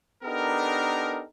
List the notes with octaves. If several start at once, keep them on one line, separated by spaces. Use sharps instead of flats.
B3 D4 D#4 G4 A4 A#4